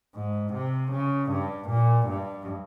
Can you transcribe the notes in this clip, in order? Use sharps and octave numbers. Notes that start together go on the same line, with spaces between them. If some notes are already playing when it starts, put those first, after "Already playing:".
G#2
C3
C#3
G2
A#2
G2